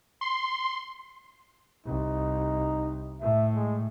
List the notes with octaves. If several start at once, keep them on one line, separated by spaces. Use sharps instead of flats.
C6
C2 D#4
A2 E5
G#3